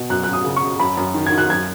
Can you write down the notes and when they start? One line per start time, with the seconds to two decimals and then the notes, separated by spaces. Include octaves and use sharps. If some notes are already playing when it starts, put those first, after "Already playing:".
Already playing: B2
0.10 F#2 F#6
0.23 F#2 F#6
0.33 D#6
0.45 C#3
0.56 C#6
0.62 C#3
0.80 F#2 B5
0.97 F#2
1.14 D#3
1.27 G#6
1.32 D#3
1.38 F#6
1.49 F#2 G#6